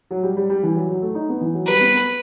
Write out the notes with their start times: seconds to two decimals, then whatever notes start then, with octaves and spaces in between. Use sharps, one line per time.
0.11 F#3
0.23 G3
0.37 G3
0.50 G3
0.63 E3
0.75 F#3
0.89 F#3
1.02 A3
1.15 D#4
1.29 B3
1.41 E3
1.54 F#3
1.68 G3 B4
1.81 B3
1.94 B3